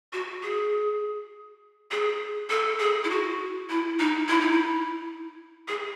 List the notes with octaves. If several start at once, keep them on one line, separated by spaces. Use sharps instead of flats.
F#4
G#4
G#4
A4
G#4
E4
F#4
E4
D#4
E4
D#4
E4
G#4